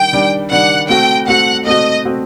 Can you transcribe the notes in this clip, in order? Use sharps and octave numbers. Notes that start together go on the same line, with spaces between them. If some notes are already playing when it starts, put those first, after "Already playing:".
Already playing: D#3 G3 D4 G5
D#3 G3 D4
D#3 G3 D4 F#5
A3 C4 F#4 G5
A3 C4 F#4 F#5
A3 C4 F#4 D#5
A3 C4 F#4